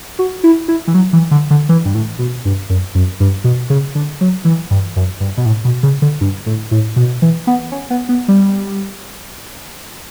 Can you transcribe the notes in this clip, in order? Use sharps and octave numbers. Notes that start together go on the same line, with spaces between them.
F#4
E4
E4
E3
F#3
E3
D3
D3
E3
G2
A2
B2
G2
F#2
F#2
G2
B2
C#3
D3
F#3
E3
G2
F#2
G2
B2
A2
B2
C#3
D3
G2
A2
A2
B2
E3
B3
C#4
B3
B3
G3